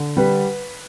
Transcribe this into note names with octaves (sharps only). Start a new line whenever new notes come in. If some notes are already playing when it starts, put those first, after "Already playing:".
Already playing: D3
G3 B4